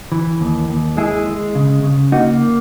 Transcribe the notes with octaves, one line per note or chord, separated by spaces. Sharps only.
E3
D#2
D#2
G#3 E4 G#4
G#3
C#3
C#3
A#3 D#4 F#4